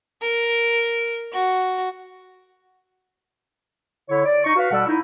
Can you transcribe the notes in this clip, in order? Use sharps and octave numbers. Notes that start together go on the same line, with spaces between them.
A#4
F#4
D3 E4 C#5
D5
D#4 D#5 C#6
F#4 B4 F5
B2 G3 A4 F#5 E6
D#4 E4